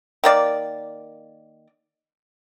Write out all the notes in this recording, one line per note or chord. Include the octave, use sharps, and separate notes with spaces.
D#3 A#3 D5